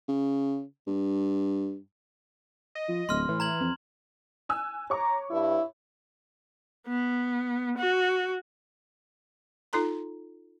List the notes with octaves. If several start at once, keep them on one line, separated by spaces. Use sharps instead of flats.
C#3
G2
D#5
F3
D1 C6 F6
A2 E3
A#5 G#6 F#7
F2
G#5 E6 F#6
C#5 A#5 C#6 D6
G2 E4
B3
F#4
D#4 F4 A4 A#5 C6